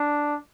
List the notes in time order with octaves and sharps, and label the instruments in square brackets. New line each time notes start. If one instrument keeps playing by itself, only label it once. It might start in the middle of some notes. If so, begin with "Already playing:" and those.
Already playing: [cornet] D4